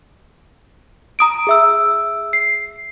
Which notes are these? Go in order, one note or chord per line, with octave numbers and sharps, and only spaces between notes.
A#5 D#6 D7
G#4 E5 E6
C7